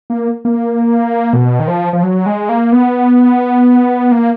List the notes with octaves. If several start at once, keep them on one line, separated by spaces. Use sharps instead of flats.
A#3
A#3
B2
D#3
F3
F3
F#3
G#3
A#3
B3
A#3